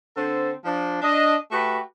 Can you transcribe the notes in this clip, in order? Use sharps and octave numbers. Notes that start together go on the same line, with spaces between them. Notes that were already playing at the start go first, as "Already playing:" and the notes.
D3 C4 A4 C5
F3 D4
D4 D#5
A3 F#4 G4 B4